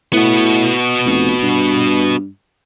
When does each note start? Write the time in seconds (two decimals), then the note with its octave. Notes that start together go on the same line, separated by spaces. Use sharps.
0.13 A2 B3 F#4
1.05 F1
1.42 G2